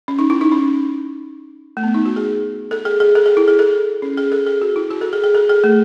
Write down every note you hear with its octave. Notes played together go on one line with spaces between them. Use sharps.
C#4
D#4
E4
D#4
C#4
A3
B3
D#4
F#4
G#4
A4
G#4
G#4
A4
G#4
E4
G#4
A4
C#4
G#4
A4
G#4
F#4
E4
F#4
A4
G#4
G#4
A4
G#4
A3